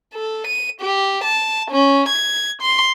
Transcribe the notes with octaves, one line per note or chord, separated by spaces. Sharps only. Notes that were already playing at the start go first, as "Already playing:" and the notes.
A4
D#7
G4
A5
C#4
G#6
C6